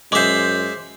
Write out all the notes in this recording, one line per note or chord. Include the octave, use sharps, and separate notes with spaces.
F#2 G#3 C5 E5 D6